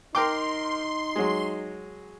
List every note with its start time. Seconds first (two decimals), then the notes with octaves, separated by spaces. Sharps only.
0.15 D#4 A#4 G5 C6 D6
1.16 F#3 G#3